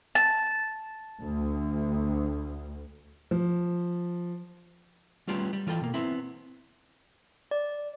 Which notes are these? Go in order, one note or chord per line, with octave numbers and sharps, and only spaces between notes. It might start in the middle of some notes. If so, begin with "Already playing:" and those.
A5
D2
F3
G3 A3 B3 C#4 F4 G4
G3
E3 F4 A4 G5
B2 A#3
B3 C4 E4
D5